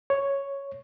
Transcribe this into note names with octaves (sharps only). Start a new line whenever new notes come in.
C#5